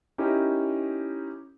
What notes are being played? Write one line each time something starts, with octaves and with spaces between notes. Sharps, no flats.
C#4 D#4 E4 G4 A#4